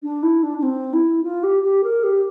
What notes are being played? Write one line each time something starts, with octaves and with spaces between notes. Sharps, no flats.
D4
E4
D4
D4
C4
E4
F4
G4
G4
A#4
G4